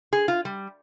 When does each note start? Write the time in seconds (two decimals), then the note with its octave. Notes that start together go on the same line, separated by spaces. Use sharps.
0.13 G#4
0.28 F4
0.45 G3